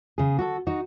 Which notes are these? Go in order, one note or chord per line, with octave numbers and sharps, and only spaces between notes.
C#3 G#4
F#4 G#4 A4
D#4 F#4